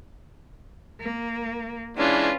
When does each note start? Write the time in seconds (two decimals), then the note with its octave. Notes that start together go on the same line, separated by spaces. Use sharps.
1.01 A#3
1.97 E3 G#3 C#4 D4 F4 B4